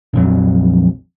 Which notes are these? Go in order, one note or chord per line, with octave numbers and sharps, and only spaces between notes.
A#1 F2 F#3